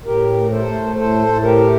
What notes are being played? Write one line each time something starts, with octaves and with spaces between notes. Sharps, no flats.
A2 G4 A#4
A3
A4 C5
A3
A2 A4 C5
A2
G4 A#4
A3